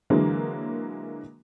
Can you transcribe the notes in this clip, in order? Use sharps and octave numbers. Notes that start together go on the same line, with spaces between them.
D3 E3 F#3 G#3 A#3